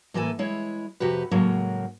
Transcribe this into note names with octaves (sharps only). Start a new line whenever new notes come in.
A2 E3 A#3 A4 G#5
G#3 E4 C#5
F2 C3 F#4 G4 B4
A2 C#3 F#3 G#3 A#3